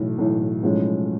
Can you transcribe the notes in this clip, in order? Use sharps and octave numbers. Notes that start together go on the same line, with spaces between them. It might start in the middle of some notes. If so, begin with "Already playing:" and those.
Already playing: B1 A2 E3
B1 A2 E3
B1 A2 F3 G#3 C#4